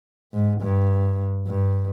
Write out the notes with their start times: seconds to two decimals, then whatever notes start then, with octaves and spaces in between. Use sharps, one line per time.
0.33 G#2
0.61 G2
1.47 G2